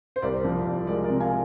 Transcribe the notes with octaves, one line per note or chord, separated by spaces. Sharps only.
C5
C2 A#4 D5
F3
C2
G#3 A#4 D5
A#4 D5
C3
F5 G#5